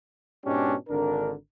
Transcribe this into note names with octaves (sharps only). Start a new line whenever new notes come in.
G#2 B2 G#3 C#4 D4 G4
G#1 D3 D4 A#4